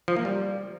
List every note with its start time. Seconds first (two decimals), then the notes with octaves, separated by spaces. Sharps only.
0.08 F3
0.16 A#3
0.25 G3